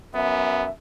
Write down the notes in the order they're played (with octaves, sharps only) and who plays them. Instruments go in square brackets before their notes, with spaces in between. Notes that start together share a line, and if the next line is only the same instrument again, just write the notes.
[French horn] F#2 [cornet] B3 [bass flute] E5